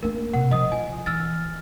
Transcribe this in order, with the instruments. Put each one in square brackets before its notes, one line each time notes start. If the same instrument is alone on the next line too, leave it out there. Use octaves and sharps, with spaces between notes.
[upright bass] A#3 D4 [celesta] A#4
[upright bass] C3 [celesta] F#5
[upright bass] F3 [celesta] D#5 D#6
[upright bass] F4 [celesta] G#5
[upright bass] E3 [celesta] E6 F6 A6